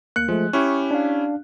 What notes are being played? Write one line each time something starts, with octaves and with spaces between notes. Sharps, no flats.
D2 A#3 F#6 C#7
F3 G#3 A3
C#4 E4 G4 C#6
D4 F5